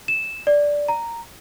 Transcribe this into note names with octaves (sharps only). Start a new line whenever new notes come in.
E7
D5
A#5